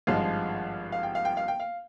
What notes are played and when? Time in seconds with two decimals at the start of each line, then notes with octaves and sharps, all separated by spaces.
0.07 G#1 G2 F3 G#3 F5
0.92 F5
1.03 G5
1.15 F5
1.25 G5
1.37 F5
1.48 G5
1.60 F5